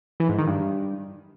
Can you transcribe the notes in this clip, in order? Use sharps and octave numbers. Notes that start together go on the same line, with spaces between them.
E3
G#2
D#3
G2